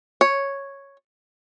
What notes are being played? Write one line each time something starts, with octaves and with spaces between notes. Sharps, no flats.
C#5